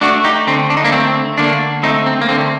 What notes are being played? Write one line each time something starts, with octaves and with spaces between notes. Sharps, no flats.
A3 D4 F#4
D#4 G4
D3 C4
D4
D#4
A#3 D4
A3 C4
D3 A#3 D4
A3 C4 D#4
C4
A#3
D3 C4